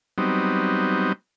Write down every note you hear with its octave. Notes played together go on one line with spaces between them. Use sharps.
F#3 G3 B3 C4 D#4